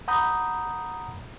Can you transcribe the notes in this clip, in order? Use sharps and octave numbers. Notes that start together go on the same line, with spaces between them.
F#5 A#5 B5 D#6 G6